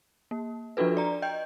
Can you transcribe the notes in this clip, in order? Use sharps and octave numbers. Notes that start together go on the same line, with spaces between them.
A#3
F3 D4 F4 F#4 A4 B4
D5 A#5
D#5 G5 G6